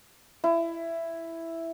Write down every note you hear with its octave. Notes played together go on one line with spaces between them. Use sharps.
E4